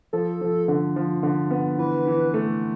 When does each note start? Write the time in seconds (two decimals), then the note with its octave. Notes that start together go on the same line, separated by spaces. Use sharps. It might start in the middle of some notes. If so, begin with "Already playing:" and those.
0.13 F3 A4
0.41 F3
0.68 D3
0.96 F3
1.23 D3
1.50 B3
1.78 E3 B4
2.07 E3
2.34 A3